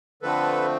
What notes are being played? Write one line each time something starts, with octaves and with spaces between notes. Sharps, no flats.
D3 F3 A3 C4 A4 B4